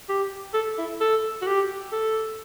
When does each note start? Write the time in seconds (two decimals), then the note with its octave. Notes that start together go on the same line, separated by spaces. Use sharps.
0.09 G4
0.54 A4
0.78 E4
1.01 A4
1.42 F#4
1.47 G4
1.92 A4